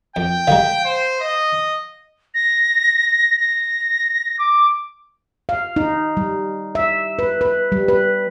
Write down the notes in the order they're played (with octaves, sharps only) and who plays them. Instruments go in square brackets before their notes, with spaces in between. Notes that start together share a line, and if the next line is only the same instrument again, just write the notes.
[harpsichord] F2 [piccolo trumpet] G5
[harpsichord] D3 G3 G#3 [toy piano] F5 A#5
[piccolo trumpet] C5
D#5
[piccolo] A#6
A#6
D6
[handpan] F5
D#4
G3
E5
B4
B4
G3
B4